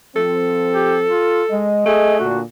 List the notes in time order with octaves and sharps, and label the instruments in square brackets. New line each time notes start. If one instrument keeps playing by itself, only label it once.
[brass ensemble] F3 C4 [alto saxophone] A4
[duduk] G4
F4
[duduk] G#3 [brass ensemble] D#5
[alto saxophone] A3 [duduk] G#4
[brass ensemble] A#2 D3 D4 [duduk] F#4